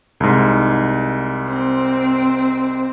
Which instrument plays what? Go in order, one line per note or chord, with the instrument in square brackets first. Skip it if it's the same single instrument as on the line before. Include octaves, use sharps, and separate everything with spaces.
[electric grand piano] C2 G#2
[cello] C4